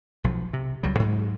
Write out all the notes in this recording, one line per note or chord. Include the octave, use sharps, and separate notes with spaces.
B1 F3
C3
C#2 F#3 G3
G#2 F#3 G#3